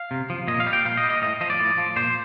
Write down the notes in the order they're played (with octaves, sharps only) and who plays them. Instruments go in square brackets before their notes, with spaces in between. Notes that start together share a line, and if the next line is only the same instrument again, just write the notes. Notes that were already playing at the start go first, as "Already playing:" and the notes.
Already playing: [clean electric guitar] F5
C3
F3
A#2 D#5
F5
G3
G5
A#2 F5
D#5
G3
D#5
A2 D#5
F3 D#5
D5
A2
F3
A#2 C5